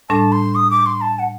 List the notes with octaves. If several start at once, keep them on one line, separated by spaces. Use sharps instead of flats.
A2 G3 D4 A4 A5
C6
D#6
D6
C6
A5
F#5